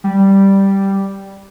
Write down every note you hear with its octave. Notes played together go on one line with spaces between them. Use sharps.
G3